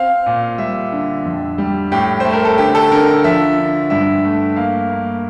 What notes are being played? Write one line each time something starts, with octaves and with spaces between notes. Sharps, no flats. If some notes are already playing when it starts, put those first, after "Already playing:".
Already playing: C4 F5
A#2
G3 E5
D3
F2
G3
A2 G4
A3 C5
A#4
A4
D3 G4
A4
D3 A#4
F3 E5
D3
G2 E5
A3
A#3 F5
A#3